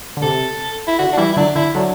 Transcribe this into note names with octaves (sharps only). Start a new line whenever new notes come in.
D3
C3 A4
E4
D3 F#4
D4
E3 G3 E4
E4
D3 F#3 D4
D3 E4
D3 F#3 D4